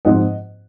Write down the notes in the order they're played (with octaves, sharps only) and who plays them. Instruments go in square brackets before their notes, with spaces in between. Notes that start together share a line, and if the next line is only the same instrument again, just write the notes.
[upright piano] G#2 F3 C4 D#5 F#5